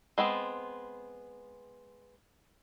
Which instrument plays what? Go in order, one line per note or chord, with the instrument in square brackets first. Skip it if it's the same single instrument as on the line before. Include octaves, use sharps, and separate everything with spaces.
[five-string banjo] G#3 B3 C4